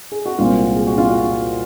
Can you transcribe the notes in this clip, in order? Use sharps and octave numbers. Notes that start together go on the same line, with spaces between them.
G#4
F#4
C2 A#2 G#3 C4 F4
G#4
F#4
F4
F#4